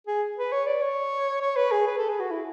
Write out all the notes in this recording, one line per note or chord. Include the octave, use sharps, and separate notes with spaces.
G#4
B4
C#5
D5
C#5
C#5
B4
G#4
B4
A4
G#4
F#4
E4